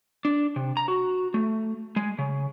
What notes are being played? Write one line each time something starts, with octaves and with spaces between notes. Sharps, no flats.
D4
C3
A#5
F#4
A3
G#3
C#3